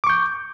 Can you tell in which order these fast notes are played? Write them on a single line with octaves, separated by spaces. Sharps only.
D6 C#6 G6